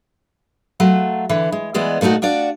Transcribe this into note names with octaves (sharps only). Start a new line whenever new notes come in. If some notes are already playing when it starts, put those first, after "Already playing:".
F#3 A3 F4
D3 E3
G#3
E3 G#3 B3 D5 D#5
A#2 A3 C4 D#4 F#4
D4 F4 F#4 D5